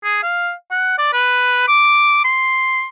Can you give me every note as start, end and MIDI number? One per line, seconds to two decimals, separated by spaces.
0.04 0.19 68
0.23 0.52 77
0.71 0.94 78
0.98 1.11 74
1.13 1.65 71
1.68 2.22 86
2.25 2.86 84